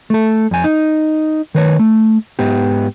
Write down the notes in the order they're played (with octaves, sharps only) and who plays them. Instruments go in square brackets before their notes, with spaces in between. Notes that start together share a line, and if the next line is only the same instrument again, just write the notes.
[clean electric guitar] A3 A4
F2 G#5
D#4
D#3 B4 C#5
A3
G#2 B3 G4